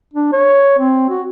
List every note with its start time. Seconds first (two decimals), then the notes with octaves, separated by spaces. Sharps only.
0.14 D4
0.33 C#5
0.79 C4
1.10 F#4